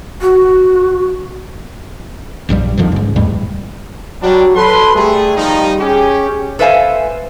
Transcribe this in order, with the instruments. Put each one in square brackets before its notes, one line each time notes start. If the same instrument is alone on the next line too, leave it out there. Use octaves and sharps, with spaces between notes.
[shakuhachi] F#4
[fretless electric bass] A#1 G2 D3 G3
F2 D3 D#3 F3
C#2 G#2
E2 A2 G3 G#3
[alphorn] F#3 [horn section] G3 D4
[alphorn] A4 [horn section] B4 C6
[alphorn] G3 [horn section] A3 G#4
[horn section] D#3 F3 D#4
[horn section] C#4 G4 [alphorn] G#4
[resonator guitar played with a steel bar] A4 B4 C5 E5 F5 G#5